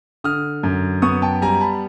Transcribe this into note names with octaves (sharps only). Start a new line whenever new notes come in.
D3 D#6 F6
F#2
B3 C#6 D#6
G5 A5
G3 G#5 A#5
A5 B5